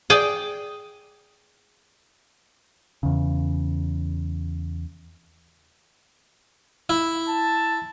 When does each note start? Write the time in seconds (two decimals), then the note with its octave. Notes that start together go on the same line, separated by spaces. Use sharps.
0.10 G#4 D5 G5
3.03 E2 C#3
6.90 E4
7.29 A5